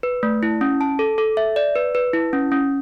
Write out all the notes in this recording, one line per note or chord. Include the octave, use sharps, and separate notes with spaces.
B4
A3
E4
C#4
A5
A4
A4
E5
D5
B4
B4
E4
C#4
C#4